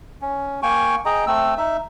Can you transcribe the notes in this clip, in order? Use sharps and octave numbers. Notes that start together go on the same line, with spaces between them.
C#4
A#3 G5 G#5 C#6
G#4 D#5 G5 A#5
A3 C4 E6
D#4 E5